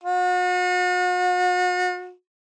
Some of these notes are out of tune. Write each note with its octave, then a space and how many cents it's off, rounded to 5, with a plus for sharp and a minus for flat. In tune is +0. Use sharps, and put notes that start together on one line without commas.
F#4 -40